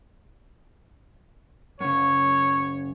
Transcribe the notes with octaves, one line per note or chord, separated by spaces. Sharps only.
F#2 C#3 C#5